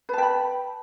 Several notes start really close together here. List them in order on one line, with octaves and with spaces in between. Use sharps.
B4 A5 G5 B5